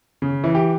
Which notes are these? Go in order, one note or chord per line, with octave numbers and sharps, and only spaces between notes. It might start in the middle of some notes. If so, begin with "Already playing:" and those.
C#3
E3
G4